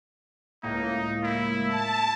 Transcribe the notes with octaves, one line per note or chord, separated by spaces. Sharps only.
C#2 A2 A#3 D#4
E4
A5